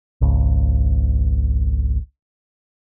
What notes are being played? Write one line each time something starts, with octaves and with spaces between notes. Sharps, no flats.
G#1 C#2